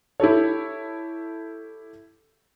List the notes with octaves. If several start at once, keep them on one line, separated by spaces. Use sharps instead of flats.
E4 G4 A4 C#5